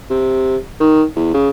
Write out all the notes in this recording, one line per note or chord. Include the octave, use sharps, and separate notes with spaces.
C3
D#3
E2
C#3